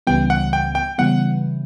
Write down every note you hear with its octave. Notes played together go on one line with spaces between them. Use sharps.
C#2 C#3 E3 G3 B3 G5
F#5
G5
G5
C#3 E3 G3 B3 F#5